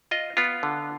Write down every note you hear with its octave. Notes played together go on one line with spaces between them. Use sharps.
F4 D#5
B3 F4
D3